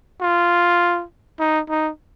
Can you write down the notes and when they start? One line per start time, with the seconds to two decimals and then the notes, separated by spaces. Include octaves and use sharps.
0.21 F4
1.40 D#4
1.69 D#4